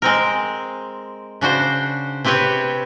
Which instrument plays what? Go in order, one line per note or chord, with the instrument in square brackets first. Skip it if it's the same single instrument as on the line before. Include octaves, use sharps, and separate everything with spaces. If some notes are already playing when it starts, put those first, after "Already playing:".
[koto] G#3 C4 A#4
C#3 D4 F#4 C5
C3 C4 G4 B4 C#5